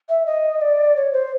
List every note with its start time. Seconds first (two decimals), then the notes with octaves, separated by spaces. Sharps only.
0.09 E5
0.26 D#5
0.61 D5
0.96 C#5
1.13 C5